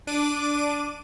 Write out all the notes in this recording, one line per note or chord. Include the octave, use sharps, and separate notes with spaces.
D4 D6 D#7